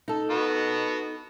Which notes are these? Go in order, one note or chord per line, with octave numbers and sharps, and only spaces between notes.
D#4 A4
B3 F#4